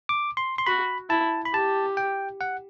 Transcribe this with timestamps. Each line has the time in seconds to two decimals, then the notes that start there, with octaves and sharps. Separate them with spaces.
0.09 D6
0.37 C6
0.58 C6
0.66 F#4 B5
1.10 E4 A5
1.45 B5
1.54 G4 A5
1.97 G5
2.41 F#5